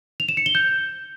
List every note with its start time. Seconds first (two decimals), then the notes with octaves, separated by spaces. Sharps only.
0.20 F7
0.29 E7
0.37 C#7
0.46 G7
0.55 G6